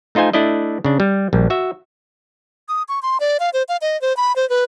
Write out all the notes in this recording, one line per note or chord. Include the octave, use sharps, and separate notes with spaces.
A3 D#4 F4 C5 G#5
A3 D4 E4 D5 D#5
C#3 D4
G3
A#1 G3
F#4 E5
D#6
C#6
C6
D5
F5
C5
F5
D#5
C5
B5
C5
B4